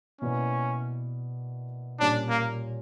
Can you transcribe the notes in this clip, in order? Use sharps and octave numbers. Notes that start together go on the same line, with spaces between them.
B2 A#3 C#4 E4 B4 D5
A#2 G3 C#4 D4
A#3